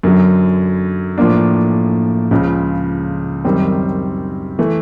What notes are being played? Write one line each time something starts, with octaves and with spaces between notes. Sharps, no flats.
F#2 D3 F#3
A2 F3 A#3 D4
C#2 C#3 F3
F#2 D#3 G3 C4
E3 A3